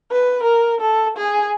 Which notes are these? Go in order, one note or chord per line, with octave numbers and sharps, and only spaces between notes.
B4
A#4
A4
G#4